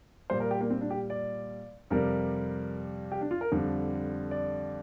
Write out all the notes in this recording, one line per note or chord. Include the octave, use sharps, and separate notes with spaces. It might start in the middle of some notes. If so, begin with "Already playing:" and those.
A#2 G3 C5
A#4
G4
A#3
C4
D4
G4
D5
F2 C3 G3 A#4
G4
D4
F4
A#4
F2 D3 G3
D5